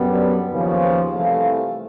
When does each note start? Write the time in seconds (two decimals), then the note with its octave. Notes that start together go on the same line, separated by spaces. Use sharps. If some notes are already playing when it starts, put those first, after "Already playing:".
Already playing: F#2 D3 G3 B3
0.51 D#2 C#3 F3
1.13 C2 C3 E3 A3 F5